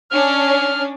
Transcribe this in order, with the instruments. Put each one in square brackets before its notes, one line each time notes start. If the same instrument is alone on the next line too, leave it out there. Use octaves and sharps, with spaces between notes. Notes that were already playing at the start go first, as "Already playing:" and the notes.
[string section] C#4 D4 [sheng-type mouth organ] F6